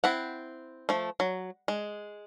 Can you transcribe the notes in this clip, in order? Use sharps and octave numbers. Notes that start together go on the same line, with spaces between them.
C4 E4 F#5
F3 A3
F#3
G#3